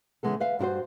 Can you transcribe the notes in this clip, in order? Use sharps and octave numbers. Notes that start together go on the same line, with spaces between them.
C#3 E3 G#3 B3 A4
B4 E5 F5
G2 E4 F#4 C5